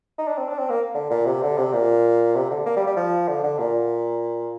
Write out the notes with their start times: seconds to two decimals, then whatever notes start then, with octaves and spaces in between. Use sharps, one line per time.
0.18 D#4
0.28 D4
0.38 C4
0.49 D4
0.59 C4
0.70 A#3
0.95 D3
1.10 A#2
1.26 C3
1.42 D3
1.57 C3
1.73 A#2
2.35 C3
2.50 D3
2.66 A#3
2.76 G3
2.87 G3
2.96 F3
3.28 D3
3.43 D3
3.59 A#2